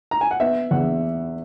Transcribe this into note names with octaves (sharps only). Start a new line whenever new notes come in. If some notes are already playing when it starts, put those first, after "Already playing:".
A#5
G#5
F#5
B3 E5
E2 F#5